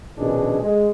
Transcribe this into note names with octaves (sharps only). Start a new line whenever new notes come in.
A#1 B2 D#3 C#4 D4 G#4
G#3